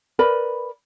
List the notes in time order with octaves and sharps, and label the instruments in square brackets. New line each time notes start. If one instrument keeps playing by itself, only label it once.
[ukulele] A#4 B4 D5 B5